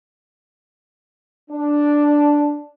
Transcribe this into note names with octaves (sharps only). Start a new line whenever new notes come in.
D4